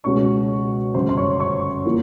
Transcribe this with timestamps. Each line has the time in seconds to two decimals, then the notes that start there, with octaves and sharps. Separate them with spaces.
0.04 C#2 B2 G#3 C#4 C#5 C#6
0.94 G1 F#2 C#3 C5 C6
1.09 C6
1.17 C#5 C#6
1.40 C#5 C#6
1.86 F3 A#3